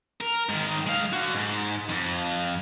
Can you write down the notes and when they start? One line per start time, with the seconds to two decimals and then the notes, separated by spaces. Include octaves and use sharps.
0.21 A#4
0.49 G#2 D#3
0.87 G#3 F5
1.13 D3 F#4
1.34 G#2
1.89 F2